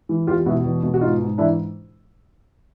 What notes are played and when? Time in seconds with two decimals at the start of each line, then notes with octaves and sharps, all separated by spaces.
0.09 E3
0.27 E2 F4 G4
0.46 B2 E4 F#4
0.64 E2
0.83 B2
0.94 F#4
1.01 G#2 D#4 F4
1.20 G#2
1.38 E3 D4 E4